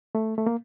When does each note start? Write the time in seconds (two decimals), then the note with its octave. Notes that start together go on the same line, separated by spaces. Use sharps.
0.15 A3
0.38 A3
0.46 A#3